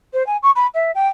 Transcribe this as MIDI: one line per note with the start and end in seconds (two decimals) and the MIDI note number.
0.13 0.25 72
0.26 0.37 80
0.43 0.51 85
0.55 0.67 83
0.74 0.91 76
0.95 1.08 79